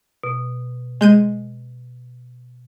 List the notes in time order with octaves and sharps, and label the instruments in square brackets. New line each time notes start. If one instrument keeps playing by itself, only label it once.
[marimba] B2
[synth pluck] G#3 G6 D#7